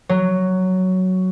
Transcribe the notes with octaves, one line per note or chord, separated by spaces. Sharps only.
F#3